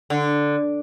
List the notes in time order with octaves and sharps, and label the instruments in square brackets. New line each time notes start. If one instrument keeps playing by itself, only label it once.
[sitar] D3